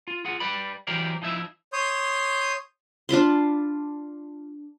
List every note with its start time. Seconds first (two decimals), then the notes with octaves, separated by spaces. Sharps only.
0.08 F4
0.25 F4 G#4 F#5
0.40 G3 B4 D5 B5
0.87 E3 F#3 G4 A#4 C5 D5
1.22 F3 D#4 E4 E5
1.73 C#5 C6 D#6 G6
3.09 D4 F4 B5 C6